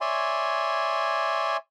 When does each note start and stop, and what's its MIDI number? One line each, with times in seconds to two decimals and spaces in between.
0.01 1.57 73
0.01 1.57 74
0.01 1.57 76
0.01 1.57 80
0.01 1.57 84